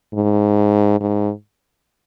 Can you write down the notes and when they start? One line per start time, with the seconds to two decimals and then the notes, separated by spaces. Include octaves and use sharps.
0.13 G#2
1.00 G#2